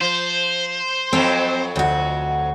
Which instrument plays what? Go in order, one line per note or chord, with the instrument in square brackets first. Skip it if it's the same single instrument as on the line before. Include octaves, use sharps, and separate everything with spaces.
[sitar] F3 [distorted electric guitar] C5
[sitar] F2 F#3 A4 [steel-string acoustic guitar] C4
[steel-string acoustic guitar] D2 F#4